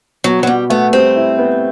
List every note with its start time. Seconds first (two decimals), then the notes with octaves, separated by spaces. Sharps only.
0.24 B2 F#3
0.43 F#3
0.47 B2 G3
0.70 A3 B3
0.93 G3 C4
1.16 E4
1.39 B3